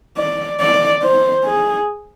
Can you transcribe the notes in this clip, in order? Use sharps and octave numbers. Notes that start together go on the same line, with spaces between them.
D5
D5
C5
G#4